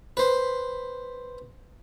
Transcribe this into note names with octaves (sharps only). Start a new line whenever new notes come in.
B4 C5